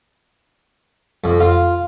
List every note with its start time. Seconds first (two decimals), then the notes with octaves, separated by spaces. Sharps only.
1.24 F2
1.40 F4